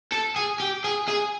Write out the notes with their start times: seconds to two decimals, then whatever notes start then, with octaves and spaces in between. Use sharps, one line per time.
0.12 A4
0.36 G#4
0.60 G4
0.84 G#4
1.08 G#4